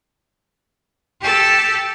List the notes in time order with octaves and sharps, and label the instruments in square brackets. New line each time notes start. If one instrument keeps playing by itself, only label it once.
[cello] G4 A4